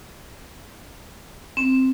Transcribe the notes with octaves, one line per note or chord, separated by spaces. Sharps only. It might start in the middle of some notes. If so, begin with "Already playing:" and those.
C4